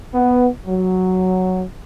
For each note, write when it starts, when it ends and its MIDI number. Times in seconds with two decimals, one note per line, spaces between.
0.14 0.48 59
0.66 1.62 54